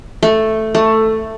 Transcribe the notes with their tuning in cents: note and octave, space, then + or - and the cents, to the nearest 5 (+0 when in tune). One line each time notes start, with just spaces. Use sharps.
A3 +0
A3 +10